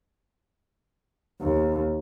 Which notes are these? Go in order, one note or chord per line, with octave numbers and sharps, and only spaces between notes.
D#2